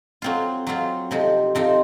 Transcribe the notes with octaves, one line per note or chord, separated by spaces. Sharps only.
F#3 C4 F4
F#3 C4 F4
C3 F3 C4 D#4
C3 F3 C4 D#4